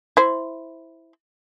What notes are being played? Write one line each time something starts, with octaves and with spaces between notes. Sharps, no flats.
E4 C5